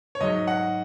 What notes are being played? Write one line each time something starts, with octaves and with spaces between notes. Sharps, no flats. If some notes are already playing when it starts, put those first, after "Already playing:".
C#5
G#2 F#3 D#5
F#5